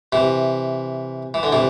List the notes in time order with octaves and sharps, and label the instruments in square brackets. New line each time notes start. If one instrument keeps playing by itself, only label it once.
[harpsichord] C3 E3
E3
D3
C3 E3